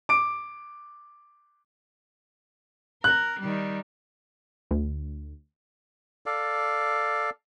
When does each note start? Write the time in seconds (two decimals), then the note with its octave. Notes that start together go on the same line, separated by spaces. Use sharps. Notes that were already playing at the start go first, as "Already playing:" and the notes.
0.09 D6 D7
3.04 A#4 F#6
3.40 D#3 G3
4.71 D2
6.26 A4 D5 F5